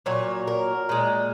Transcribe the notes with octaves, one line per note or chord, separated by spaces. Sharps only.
A#2 F#3 C#5
A#4
A#2 G#3